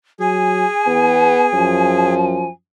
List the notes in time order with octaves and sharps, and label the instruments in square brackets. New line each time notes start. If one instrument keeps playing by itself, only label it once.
[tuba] F#3 [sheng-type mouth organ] G#4 [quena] G#5
[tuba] E2 [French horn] B3
[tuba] F#2 [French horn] F3